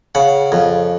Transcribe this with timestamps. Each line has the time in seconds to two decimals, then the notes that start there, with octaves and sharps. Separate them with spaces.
0.15 C#3 F#5
0.52 F2